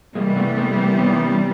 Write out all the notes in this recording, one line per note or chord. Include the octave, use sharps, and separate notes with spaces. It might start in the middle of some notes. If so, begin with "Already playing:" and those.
C3 E3 G3 G#3 A#3
A3 B3
A3 B3
A#3 C4
B3 C#4